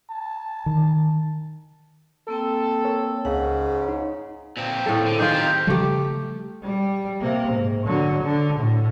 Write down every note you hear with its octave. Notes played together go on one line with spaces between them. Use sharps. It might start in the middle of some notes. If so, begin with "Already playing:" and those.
A5
D#3
A#3 C4 A4 G5
A#4 C#5
C#2 G#2 C#3 F#5
D#4
A#2 C4
A2 A4
D3
D#3 D#4 F4 G4 G#4
C4 A#4
C#3 F3 G3 A3 G4
G3
C3 A#3
G#2
D3 F#3
D3
A2